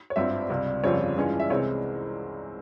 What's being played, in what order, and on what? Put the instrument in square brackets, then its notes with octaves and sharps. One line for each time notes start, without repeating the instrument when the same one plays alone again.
[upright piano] C#5
G#1 G2 G3 C4 F4 E5
C#2 C3 G3
G1 F2 C#3 G3 C4 C#5
G2 E3 G#3 C#4 F4
E5
C2 C3 E3 G#3 C4 C#5